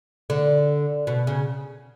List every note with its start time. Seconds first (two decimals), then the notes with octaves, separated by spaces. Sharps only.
0.30 D3
1.07 B2
1.27 C#3